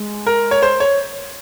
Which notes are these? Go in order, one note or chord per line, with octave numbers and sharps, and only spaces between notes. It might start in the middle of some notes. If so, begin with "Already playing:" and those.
Already playing: G#3
A#4
C#5
C5
C#5